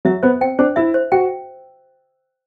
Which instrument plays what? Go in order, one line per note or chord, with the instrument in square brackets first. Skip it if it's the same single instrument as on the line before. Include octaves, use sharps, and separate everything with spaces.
[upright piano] F#3 [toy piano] E5
[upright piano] B3 [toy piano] C5
[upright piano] C4 [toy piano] G5
[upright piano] D4 [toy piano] C5
[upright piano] E4 [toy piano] E5
[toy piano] C5
[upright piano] F#4 [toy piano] G5